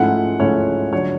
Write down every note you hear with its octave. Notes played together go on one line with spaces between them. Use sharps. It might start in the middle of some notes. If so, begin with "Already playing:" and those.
Already playing: G#2 F3 A3 C#4 E4 F#5
G#2 F3 A3 C#4 E4 C#5
D3 F#3 C#5